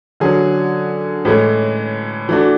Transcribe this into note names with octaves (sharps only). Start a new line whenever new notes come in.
D3 F#3 C#4 G#4
A2 E3 G#3 C#4
E3 A3 D4 F#4